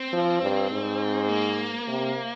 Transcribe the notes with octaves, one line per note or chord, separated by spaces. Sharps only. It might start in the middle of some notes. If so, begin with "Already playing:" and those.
Already playing: C4
F3
G2
G#2
A#3
C3